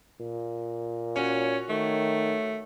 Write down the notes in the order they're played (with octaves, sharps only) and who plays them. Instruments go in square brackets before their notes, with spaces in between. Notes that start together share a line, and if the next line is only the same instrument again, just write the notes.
[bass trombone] A#2
[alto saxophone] C#4 [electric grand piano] F#4 C#5
[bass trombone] D#3 [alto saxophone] A3